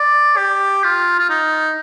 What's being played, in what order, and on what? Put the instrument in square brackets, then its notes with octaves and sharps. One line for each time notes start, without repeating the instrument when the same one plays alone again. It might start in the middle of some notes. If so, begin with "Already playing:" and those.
Already playing: [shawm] D5
G4
F4
F4
D#4